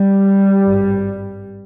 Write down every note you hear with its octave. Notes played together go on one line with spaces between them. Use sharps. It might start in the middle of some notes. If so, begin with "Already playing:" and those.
Already playing: G3
G#1 G2